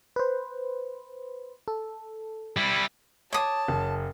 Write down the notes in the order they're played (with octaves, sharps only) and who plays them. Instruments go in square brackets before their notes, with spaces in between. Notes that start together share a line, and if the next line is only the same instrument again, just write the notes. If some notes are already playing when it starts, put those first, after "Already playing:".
[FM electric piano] B4 C5
A4
[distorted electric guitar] G3 E4
[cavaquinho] C#5 D#6 [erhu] A5 [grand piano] D6
[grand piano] F#1